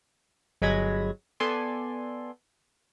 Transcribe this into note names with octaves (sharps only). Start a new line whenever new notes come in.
G1 F#3 G#3 B5 G#6 A#6
B3 A4 D5 G#5 C6